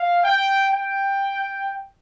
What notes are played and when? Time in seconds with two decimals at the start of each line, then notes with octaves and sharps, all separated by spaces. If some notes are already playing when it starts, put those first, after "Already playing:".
Already playing: F5
0.24 G5
0.71 G5